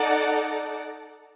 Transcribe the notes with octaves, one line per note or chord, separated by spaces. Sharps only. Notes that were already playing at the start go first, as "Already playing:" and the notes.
Already playing: D#4 A4 D5 F#5